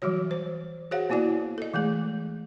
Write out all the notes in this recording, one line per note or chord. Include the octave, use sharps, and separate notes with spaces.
E3 F#3 G3 F#4 C#5
C5
F#4 G#4 C5 C#5 F5 F#5
A#3 B3 E4 F#4 D5
A4 D#5
E3 G#3 A3 G#4